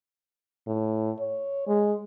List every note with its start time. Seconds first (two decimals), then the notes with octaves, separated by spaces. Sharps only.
0.67 A2
1.19 C#5
1.67 G#3